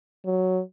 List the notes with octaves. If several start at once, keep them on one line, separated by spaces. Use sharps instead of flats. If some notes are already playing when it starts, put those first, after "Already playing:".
F#3